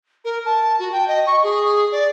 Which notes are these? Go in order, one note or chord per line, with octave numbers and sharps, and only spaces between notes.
A#4
A5
F#4
G5
D#5
C#6
G#4
D5